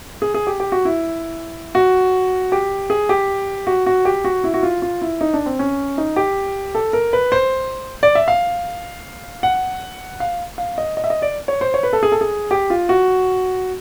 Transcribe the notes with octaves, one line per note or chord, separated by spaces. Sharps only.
G#4
G#4
G4
G4
F#4
E4
F#4
G4
G#4
G4
F#4
F#4
G4
F#4
E4
F#4
F4
F4
E4
D#4
D4
C4
C#4
D#4
G4
A4
A#4
B4
C5
D5
E5
F5
F#5
F5
F5
D#5
D#5
E5
D#5
D5
C#5
C5
C#5
B4
A4
G#4
A4
G#4
G4
F4
F#4